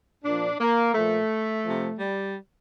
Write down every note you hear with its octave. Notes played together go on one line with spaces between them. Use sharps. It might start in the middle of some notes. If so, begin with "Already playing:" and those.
A#2 F3 D4
A#3
A#2 F3 A3
C3 F3
G3